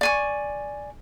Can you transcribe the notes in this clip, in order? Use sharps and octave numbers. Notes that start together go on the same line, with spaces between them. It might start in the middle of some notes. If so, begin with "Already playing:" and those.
D5 G#5 C#6